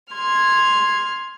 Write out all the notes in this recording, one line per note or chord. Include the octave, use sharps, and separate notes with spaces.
C6 F6 G#6